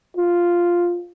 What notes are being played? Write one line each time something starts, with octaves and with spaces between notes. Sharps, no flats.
F4